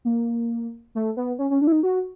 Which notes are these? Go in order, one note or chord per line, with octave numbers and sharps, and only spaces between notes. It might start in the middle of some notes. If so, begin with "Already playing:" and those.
A#3
A3
B3
C#4
C#4
D4
E4
D#4
F#4